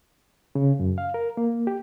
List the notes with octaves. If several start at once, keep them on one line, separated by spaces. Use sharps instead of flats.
C#3
F#2
F5
A#4
A#3
G4